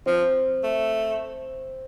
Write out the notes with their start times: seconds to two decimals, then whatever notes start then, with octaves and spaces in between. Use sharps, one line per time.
0.06 F3 C4
0.63 A3